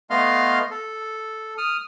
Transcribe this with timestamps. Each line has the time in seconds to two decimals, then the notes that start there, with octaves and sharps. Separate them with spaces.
0.10 A3 B3 D#5 F5 C6 F6
0.70 A4
1.58 D#6 F6